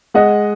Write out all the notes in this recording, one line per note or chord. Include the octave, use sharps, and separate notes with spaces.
G#3 D#5 F#5